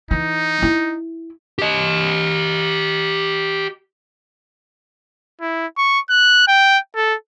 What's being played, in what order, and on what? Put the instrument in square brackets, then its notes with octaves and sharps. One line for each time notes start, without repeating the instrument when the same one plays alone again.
[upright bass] E3 [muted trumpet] D#4
[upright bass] E4
[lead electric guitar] G4 D#5
[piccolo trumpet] E4
C#6
F#6
G5
A4